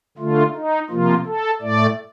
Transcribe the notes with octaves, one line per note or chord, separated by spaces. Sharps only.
D3 A3 F4
D#4
C3 F3 A#3 F4
A4
A2 A3 D5